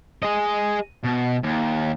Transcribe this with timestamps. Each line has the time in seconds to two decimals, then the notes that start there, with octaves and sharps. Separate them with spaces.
0.23 G#4 D#5
1.04 B2
1.43 D#2